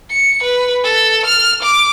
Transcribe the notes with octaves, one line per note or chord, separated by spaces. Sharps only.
C#7
B4
A4
F6
D6